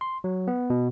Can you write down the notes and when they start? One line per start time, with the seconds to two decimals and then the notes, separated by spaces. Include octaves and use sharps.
0.01 C6
0.24 F#3
0.48 B3
0.70 B2